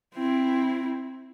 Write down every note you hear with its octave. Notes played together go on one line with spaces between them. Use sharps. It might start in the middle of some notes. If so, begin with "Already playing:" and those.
C4 E4